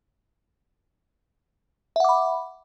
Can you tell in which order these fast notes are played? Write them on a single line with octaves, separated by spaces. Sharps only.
E5 F#5 D6 B5